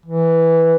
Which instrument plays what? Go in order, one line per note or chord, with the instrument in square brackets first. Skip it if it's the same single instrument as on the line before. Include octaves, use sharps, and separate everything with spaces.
[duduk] E3